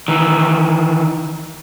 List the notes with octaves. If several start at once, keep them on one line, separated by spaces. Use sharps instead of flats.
D#3 E3